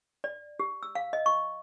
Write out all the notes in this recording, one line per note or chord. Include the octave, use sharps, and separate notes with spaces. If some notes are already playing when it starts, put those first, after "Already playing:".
D5
G4
E6
F5
D#5
C#6